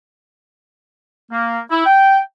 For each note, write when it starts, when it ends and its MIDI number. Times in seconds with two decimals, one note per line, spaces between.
1.30 1.59 58
1.69 1.85 64
1.85 2.19 79